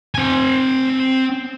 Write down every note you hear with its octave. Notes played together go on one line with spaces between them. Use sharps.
C4 G#5